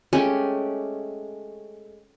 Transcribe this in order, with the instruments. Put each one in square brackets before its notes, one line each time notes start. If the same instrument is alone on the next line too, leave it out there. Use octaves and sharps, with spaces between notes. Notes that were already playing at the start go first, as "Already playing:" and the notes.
[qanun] G#3 A3 C#4 G4